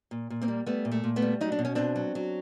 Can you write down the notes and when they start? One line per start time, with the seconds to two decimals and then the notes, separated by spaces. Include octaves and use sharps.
0.11 A#2
0.30 A#2
0.42 A#3 C4
0.48 G3
0.66 G3 A3 B3
0.85 A#2
0.91 A3
1.04 A#2
1.16 A3 B3
1.22 G3
1.41 F#3 D#4
1.52 D4
1.59 B2
1.65 C#4
1.75 B2 C4 D4
1.96 F#3
2.15 F#3